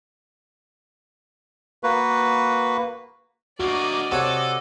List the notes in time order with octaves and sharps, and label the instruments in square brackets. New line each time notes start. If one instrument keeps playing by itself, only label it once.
[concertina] A#3 F#4 B4
[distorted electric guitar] D2 A#3 [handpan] F#4 [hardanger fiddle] D5 D#5
[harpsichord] C3 C#5 [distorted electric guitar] A4 [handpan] F#5